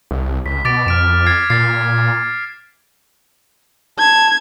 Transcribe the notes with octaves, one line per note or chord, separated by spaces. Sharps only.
C2
C#2 B6
B2 D6 A6 D7
F2 F6 D7 E7
G#6 A6 C7
A#2 A6 C7
A5 G#6